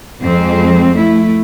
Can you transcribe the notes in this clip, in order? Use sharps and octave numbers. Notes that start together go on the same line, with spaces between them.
F2 G#3 C4
A3 E4